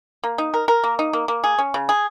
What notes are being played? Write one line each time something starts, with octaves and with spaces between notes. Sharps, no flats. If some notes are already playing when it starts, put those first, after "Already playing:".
A#3
D#4
A#4
A#4
A#3
D#4
A#3
A#3
G#4
C#4
C#3
G#4